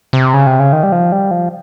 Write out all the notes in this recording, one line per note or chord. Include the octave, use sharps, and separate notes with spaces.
C3
C#3
C3
C#3
D#3
G3
F3
G3
F3